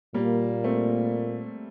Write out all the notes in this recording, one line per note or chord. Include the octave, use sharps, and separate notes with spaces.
A#2 G3 A#3
A3 C4